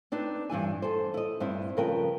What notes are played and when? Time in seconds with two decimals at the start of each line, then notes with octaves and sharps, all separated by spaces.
0.12 C4 D4 D#4 B4
0.50 G2 E3 E4 G#5
0.82 A4 C5
1.14 E4 D#5
1.40 G2 C4 E4
1.77 C#3 F3 A#4 B4 G5